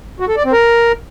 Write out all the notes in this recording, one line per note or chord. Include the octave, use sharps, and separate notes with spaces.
F#4
A4
D5
C4
A#4